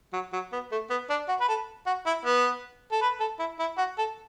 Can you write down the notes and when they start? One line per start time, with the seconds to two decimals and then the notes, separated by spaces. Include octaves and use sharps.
0.13 F#3
0.33 F#3
0.52 B3
0.72 A3
0.90 B3
1.10 D4
1.28 F#4
1.40 B4
1.48 A4
1.86 F#4
2.06 E4
2.25 B3
2.92 A4
3.02 B4
3.20 A4
3.39 E4
3.59 E4
3.78 F#4
3.98 A4